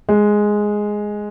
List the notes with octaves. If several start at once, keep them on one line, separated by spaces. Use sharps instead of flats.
G#3